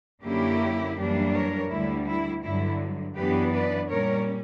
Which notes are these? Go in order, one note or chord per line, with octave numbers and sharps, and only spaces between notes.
F#2 D3 A#3 C#4 E4 G4
F#2 E3 G3 A#3 D4
A#4 C#5
D2 D3 G3 E4
E4
G2 D3 F#3 E4
F#2 E3 B3 D4 G4 B4
B4 D5
A#2 G3 C#4 A#4 C#5